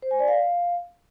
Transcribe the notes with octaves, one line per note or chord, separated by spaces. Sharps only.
C5
G#5
D5
F5